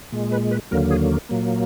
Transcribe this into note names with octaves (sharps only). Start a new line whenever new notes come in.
A#2 G#3
B4
B4
D#2 D3 F#3 A#3 A#4
G#4
A#2 F#3 A#3